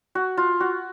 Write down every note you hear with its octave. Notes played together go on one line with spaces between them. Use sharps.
F#4
F4
F#4